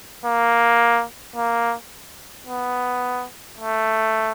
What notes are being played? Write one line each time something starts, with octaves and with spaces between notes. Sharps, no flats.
A#3
A#3
B3
A3